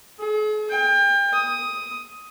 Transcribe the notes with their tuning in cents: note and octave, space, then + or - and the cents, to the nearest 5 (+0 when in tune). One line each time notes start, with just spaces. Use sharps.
G#4 +45
G5 +30
D#6 +10